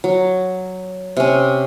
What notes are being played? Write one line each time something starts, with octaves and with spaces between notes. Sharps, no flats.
F#3
C3 C#4